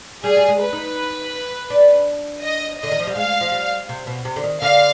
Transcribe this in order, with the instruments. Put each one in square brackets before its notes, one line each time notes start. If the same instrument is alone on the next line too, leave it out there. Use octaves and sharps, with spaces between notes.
[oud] G3 [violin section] G#4
[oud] G3
G#3
[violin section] B4
[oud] D#4
D4
[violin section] D#5
[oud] D3 [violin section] D#5
[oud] D#3
F3
G3
[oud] G#3 [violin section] F5
[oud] F3
G3
C3
B2
C3
D3
D#3
[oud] D3 [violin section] F5